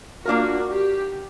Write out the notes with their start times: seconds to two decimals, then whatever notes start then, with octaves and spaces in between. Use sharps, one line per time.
0.25 A#3 D4 F4 F#4 A#4
0.70 G4